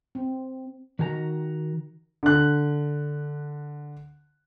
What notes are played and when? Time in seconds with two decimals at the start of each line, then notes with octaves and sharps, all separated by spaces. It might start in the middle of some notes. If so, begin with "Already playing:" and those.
0.15 C4
0.99 D#3 F#4 G#5 A#5
2.23 D3 F#6